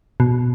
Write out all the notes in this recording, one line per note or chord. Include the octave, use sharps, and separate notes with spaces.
B2